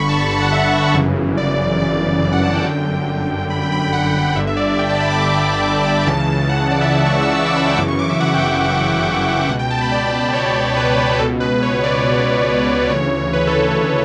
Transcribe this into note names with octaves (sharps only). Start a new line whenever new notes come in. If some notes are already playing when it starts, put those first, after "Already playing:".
Already playing: G1 G2 D3 B5 C#6
A5
B5
A5
F#5
E5
G1 F#2 C#3 E3
D5
D5
D5
F#5
A5
G5
G1 F#2 D3 G5
B5
G5
B5
G5
F#5
G1 G2 D3 E5
E5
D5
G5
A5
B5
D6
D6
B5
C#2 C#3 E3 A5
F#5
D5
E5
E5
C#6
E6
E6
D6
B5
G5
G1 F#2 C#3 E3 D6
C#6
D6
E5
F#5
G5
G5
C#2 B2 F#5
G5
A5
B5
D5
C#5
B4
C#2 B2 A4
B4
C#5
D5
D2 C#3 E3 C#5
B4
A4
B4
A4